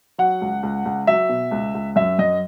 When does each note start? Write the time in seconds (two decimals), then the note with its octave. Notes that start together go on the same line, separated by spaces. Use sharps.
0.18 F#3 F#5
0.41 C#2
0.63 C#2
0.85 C#2
1.07 F#3 E5
1.29 B2
1.51 C#2
1.75 C#2
1.96 F#2 E5
2.19 F#2 D#5